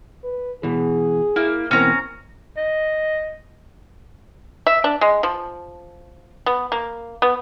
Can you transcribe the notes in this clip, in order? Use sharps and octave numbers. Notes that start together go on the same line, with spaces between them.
B4
B2 E3 G#4
A#3 E4
B2 E3 A#3 C4 C#4 A#5
D#5
E5
D4
G#3
F3
B3
A#3
B3